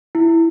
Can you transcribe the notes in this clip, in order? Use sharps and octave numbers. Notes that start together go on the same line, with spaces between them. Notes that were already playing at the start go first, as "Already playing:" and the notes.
E4